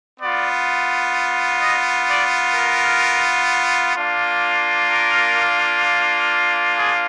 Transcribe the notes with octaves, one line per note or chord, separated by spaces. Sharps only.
B3 D5
F4
D#5
D5
A#4
A#3 D4 F4
A#4
G#4